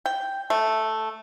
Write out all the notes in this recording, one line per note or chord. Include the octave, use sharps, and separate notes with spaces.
G5
A3